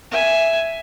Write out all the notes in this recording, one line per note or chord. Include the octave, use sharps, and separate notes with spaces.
E5 G#5